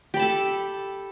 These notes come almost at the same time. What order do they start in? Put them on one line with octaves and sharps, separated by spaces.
G4 B5 A5 A4